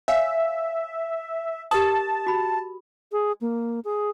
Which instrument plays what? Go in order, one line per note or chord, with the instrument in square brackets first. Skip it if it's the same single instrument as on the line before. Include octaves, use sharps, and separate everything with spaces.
[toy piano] C#5 F5 G#5 [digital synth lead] E5
[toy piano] G4 A#4 D#6 [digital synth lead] A5
[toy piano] F#4 B5
[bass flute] G#4
A#3
G#4